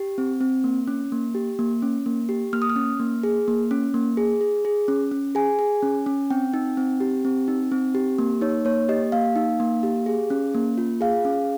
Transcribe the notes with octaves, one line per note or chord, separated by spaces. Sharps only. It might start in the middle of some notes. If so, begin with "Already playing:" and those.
Already playing: G4
C4
C4
A#3
C#4
A#3
G4
A#3
C#4
A#3
G4
A#3 F6
D#6
F6
C#4
A#3
G#4
A#3
C#4
A#3
G#4
G#4
G#4
C#4
C#4
G#4 G#5
G#4
C#4
C#4
C4 G5
D#4
C4
G4
C4
D#4
C4
G4
A#3
D#4 C#5
A#3 C#5
G4 D#5
A#3 F5
D#4
A#3
G4
G#4
C#4
A#3
F4
G#4 F5
C#4